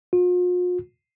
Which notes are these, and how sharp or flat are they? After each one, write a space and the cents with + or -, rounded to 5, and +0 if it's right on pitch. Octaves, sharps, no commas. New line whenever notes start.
F4 +45